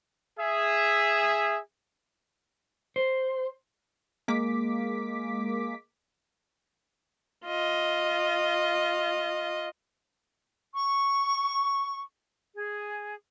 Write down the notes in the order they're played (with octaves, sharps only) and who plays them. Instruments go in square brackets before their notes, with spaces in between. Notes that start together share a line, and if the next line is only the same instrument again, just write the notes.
[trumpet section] G#4 E5
[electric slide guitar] C5
[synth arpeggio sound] G#3 A#3 D6 B6
[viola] F4 D#5
[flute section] C#6
G#4